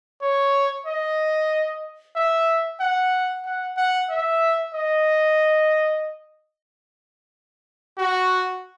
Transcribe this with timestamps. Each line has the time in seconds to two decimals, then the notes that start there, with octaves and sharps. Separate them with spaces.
0.22 C#5
0.86 D#5
2.16 E5
2.80 F#5
3.45 F#5
3.77 F#5
4.09 E5
4.74 D#5
7.98 F#4